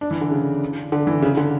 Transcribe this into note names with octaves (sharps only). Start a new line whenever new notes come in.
D4
E3
D3
C#3
D3
E3
C#3
D3